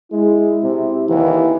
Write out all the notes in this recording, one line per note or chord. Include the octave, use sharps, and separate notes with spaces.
G#3 E4
C3
D#2 E3